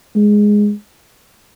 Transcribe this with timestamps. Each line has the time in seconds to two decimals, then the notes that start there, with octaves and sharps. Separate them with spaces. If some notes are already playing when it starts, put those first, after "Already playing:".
0.16 G#3